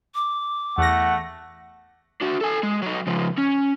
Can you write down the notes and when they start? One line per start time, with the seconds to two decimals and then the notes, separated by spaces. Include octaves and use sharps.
0.15 D6
0.78 E2 A3 F#5 A#6
2.21 D4 F#4
2.41 A4 G#5
2.63 G#3
2.82 F#3 D#4
3.07 C#3 F3
3.38 C#4